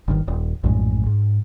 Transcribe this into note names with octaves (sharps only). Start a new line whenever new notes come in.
G1 C3 D#3
D#1
A#1 F#2 A2 G#3
G#2